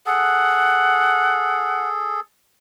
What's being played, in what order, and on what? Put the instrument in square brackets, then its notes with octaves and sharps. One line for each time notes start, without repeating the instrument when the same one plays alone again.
[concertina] G#4 A4 [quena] F#5